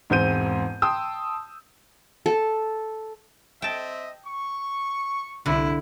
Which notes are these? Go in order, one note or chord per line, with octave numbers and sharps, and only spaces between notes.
E1 G#2 C4 G6 D#7
G5 A5 C6 D#6 E6
A4
C4 D#5 E5 G5 A5
C#6
C2 D3 E4